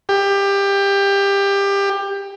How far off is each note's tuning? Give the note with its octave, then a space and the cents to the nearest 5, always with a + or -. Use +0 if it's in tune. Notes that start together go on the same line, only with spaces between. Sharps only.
G4 +20